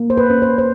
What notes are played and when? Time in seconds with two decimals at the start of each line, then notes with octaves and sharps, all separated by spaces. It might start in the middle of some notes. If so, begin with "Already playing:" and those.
Already playing: A#3
0.10 C5
0.17 B4
0.30 C#4
0.42 C5
0.58 C5